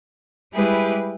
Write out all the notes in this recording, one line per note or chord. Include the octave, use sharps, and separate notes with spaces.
G3 G#3 E4 G4 G#4 B4